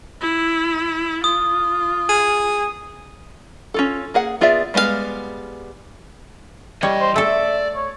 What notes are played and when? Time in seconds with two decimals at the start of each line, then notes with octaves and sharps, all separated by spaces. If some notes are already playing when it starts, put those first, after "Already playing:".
0.21 E4
1.24 F4 D#6
2.09 G#4 D#7
3.74 C#4 F4 A4
4.14 A#3 G#4 F#5
4.41 B3 F4 G#4 D5 E5
4.74 G3 G#3 B3 D4 F5
6.83 E3 G3 C#5 D#5
7.01 C5
7.16 A3 A4 D5 E5
7.75 C#5